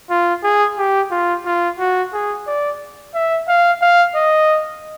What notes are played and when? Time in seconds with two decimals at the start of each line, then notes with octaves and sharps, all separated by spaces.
0.10 F4
0.44 G#4
0.78 G4
1.11 F4
1.46 F4
1.79 F#4
2.13 G#4
2.47 D5
3.14 E5
3.48 F5
3.82 F5
4.15 D#5